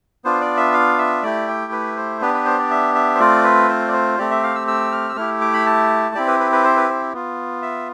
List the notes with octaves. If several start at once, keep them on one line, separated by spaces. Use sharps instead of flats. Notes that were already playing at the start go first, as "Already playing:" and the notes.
B3 D4 F4 C5
D5
E5
F5
E5
A3 E4 G4 D5
G5
B4
C5
B3 D4 G4 B4
B4
C5
D5
E5
E5
C5
A3 C4 F4 D5
B4
C5
D5
C5
A3 C4 G4 D5
E5
F5
E6
E6
F6
E6
A3 E4 G4 F6
D6
B5
A5
C4 E4 G4 D5
B4
B4
B4
C5
B4
C5
B3 F4
E5